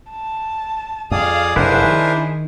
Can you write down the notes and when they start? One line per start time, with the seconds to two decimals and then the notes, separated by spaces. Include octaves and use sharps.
0.11 A5
1.11 F2 G#4 D5 F5 D#6
1.56 F1 F#2 D4 E4 G#4 A#4 C5 F#6
1.84 D#3